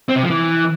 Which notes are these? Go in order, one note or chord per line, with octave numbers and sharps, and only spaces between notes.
C4
C3
F3
E3